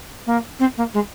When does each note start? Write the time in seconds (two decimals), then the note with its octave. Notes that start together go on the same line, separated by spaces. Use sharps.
0.26 A#3
0.59 C4
0.77 A#3
0.94 G#3